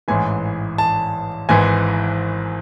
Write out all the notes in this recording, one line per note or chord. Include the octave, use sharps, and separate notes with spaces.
A1 G#2 E3 G#5
A5
G#1 G#2 E3 G#5